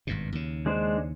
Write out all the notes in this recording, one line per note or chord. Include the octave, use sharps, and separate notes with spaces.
G#1 G2 B2
D#2 C#3
G#3 D4 C5